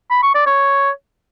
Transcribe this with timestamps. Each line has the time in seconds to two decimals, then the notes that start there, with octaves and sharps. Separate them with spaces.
0.11 B5
0.23 C#6
0.35 D5
0.47 C#5